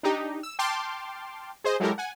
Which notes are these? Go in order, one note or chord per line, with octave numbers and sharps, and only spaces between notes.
D4 D#4 G4
E6
G5 A5 C6 D6 F6
G#4 C5 D#5
F#3 G#3 E4 G4 A4 A#4
F#5 G#5